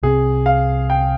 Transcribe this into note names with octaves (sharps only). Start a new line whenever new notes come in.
C2 C3 G3 C4 G#4
F5
G5